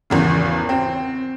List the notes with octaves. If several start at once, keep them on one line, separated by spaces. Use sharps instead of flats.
G#1 E2 C#3
C4